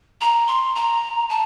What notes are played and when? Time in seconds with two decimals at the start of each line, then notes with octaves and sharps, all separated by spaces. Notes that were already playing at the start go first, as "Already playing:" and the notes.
0.21 A#5
0.47 C6
0.76 A#5
1.30 A5